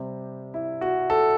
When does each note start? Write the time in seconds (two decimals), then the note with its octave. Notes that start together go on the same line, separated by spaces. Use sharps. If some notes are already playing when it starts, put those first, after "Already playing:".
Already playing: C3 G3 C5
0.54 E4
0.81 F#4
1.10 A4